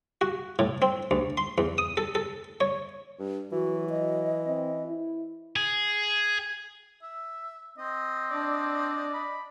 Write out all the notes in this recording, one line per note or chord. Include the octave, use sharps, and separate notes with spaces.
F#4
A2
C4
D2
C6
E2
D#6
A4
A4
C#5
G2
E3 F#3 F#4
D#5
C4
E4
G#4
E5
C4 D#5
D4 D5
B5